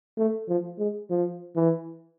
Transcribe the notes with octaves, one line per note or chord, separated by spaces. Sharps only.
A3
F3
G#3
F3
E3